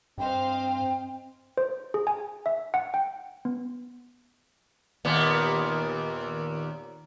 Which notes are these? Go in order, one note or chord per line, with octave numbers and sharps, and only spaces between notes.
G2 C4 C5 D#5 F5 G5
C5
G#4
G#5
E5
F#5
G5
B3
D#2 A#2 B3